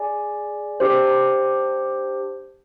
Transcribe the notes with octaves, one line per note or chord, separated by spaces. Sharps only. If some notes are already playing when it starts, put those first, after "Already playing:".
Already playing: G#4 D5 G#5
D4 G4 C5